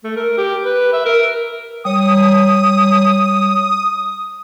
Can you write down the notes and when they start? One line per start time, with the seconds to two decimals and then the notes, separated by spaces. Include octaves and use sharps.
0.04 A3
0.17 A#4
0.38 G4
0.65 B4
0.93 E5
1.05 A#4
1.85 G3 C#5 D#6